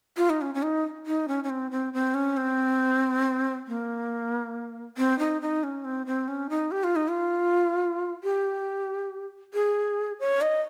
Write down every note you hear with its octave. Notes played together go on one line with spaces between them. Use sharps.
F4
D#4
C#4
C#4
D#4
D#4
C#4
C#4
C4
C4
C4
C#4
C4
A#3
C4
D#4
D#4
C#4
C4
C4
C#4
D#4
G4
F4
D#4
F4
G4
G#4
C#5
D#5